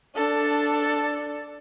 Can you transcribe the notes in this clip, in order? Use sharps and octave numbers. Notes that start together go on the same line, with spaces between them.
D4 A4